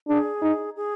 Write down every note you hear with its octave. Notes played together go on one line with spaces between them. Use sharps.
D4 G#4
D#4
G#4